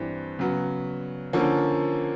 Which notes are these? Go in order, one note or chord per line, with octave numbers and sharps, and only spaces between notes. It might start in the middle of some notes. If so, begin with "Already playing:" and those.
Already playing: G2 E3 G3 C4
C#3 F#3 B3
D3 F3 A#3 C#4